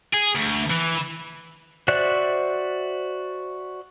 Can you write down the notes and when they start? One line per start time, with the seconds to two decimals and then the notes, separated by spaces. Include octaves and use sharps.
0.13 G#4
0.35 D2
0.70 E3
1.88 F#4 C5 D5 E5 F#6